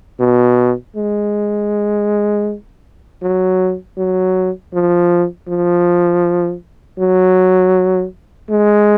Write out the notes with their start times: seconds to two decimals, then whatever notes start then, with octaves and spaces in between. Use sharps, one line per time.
0.20 B2
0.96 G#3
3.22 F#3
3.97 F#3
4.73 F3
5.48 F3
6.99 F#3
8.50 G#3